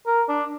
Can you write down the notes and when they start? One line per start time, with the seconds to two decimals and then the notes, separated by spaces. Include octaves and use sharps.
0.07 A#4
0.29 D4